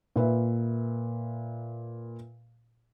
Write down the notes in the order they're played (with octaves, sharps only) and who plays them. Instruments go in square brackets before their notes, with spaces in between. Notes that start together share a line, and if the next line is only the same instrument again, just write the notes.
[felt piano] A#2 B4 E5